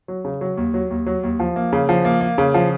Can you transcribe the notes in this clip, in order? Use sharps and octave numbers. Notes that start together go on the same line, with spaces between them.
F#3
C#3
F#3
D#2
F#3
D#2
F#3
D#2
F3
A#3
C#3
F3
A#3
A#3
C#3
F3